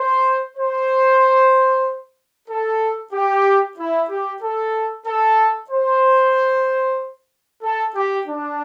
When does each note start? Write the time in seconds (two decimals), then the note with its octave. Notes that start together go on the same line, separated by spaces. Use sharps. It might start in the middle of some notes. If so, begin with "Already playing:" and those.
Already playing: C5
0.57 C5
2.49 A4
3.13 G4
3.78 E4
4.09 G4
4.42 A4
5.06 A4
5.70 C5
7.63 A4
7.95 G4
8.27 D4